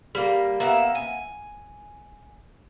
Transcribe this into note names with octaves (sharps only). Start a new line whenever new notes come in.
G3 A#3
A#3 B3 E5 F#5
G#5